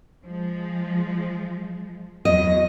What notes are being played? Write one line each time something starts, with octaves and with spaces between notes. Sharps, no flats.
F3 G#3
E2 F#3 D#5